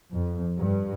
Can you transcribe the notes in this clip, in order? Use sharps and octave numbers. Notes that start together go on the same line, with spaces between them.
F2
G2